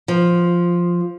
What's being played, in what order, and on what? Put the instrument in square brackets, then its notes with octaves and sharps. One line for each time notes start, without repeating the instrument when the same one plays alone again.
[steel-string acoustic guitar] F3